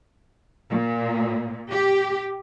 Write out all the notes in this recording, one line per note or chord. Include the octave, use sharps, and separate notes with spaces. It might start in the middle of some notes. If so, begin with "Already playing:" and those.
A#2
G4